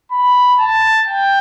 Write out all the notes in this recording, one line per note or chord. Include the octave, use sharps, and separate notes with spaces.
B5
A5
G5